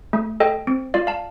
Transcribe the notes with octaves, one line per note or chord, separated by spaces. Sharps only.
A3
A4 D#5 G5
C4
F4 D5 F5
F5 A5